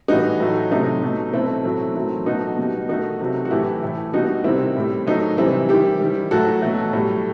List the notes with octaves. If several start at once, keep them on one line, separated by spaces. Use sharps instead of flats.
A2 E3 G3 D#4 F#4
A2 F#3 A3
C3 F#3 A3 D#4
B2 F#3 A3
B2 A3 C4 E4
A2 F#3 A3
D#3 F#3 A3
B2 F#3 A3 D#4 F#4
B2 G3
D#3 A3 D#4 F#4
C3 F#3 A3
F#4
A2 E3 A3 E4 G4
A2 E3 A3
B2 G3 D#4 F#4
C3 D#3 G3 C4 E4
A2 G3
D#3 F#3 A3 D#4
C3 E3 G3 C4 E4
D#3 G3 E4 G4
D#3 G3
A2 F#3 A3 F#4 A4
B2 F#3 A3
A2 G3